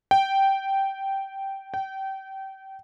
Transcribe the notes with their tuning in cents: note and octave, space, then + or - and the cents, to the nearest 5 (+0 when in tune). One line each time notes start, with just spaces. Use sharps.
G5 -10
G5 -25